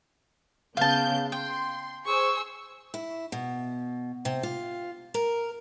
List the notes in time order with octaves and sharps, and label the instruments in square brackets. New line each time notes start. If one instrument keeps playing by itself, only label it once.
[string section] C#3 B3 G6 [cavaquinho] F5 A5
[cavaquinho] G5 [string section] C6
[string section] G#4 C5 [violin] C#6 E6
[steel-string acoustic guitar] E4
B2
C3
F4
A#4